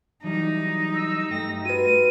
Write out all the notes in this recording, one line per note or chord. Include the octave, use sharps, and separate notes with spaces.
E3 F#3 G3 D#4
E6
G2 A3 G4 A#6
F#4 B4 D#7